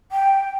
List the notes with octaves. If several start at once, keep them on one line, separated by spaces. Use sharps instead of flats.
G5